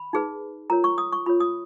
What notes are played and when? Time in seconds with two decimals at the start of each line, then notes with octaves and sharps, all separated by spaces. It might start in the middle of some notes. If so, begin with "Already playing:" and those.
Already playing: B5
0.13 D#4 G#4 B4
0.70 F4 A#4 C#5 A#5
0.84 C#6
0.98 D#6
1.13 C#6
1.26 F4 A#4 C#5 B5
1.40 D#6